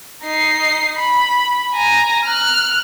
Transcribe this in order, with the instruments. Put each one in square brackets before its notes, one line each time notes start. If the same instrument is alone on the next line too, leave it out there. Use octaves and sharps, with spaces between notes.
[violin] D#4 C7
B5
G#5 A#5
F6 F#6